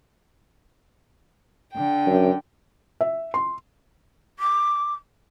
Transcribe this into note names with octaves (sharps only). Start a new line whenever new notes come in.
D3 G5
F#2
E5
C6
D6